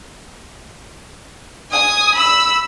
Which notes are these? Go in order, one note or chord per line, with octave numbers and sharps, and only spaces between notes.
G#5 D#6
B5 E6